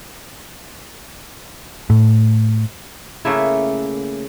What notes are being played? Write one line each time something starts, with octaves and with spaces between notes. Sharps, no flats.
A2
C#3 A3 A#3 E4